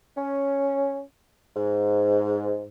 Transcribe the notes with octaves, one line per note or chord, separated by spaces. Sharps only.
C#4
G#2